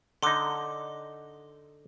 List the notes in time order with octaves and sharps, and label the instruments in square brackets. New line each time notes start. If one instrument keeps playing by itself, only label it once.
[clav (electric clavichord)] D3 D#4 [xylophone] C6 D6